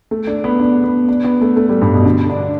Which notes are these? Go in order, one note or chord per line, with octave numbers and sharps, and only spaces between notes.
A3
D4
B3
D4
B3
D4
B3
A3
A3
G3
G2
B2
D3
D4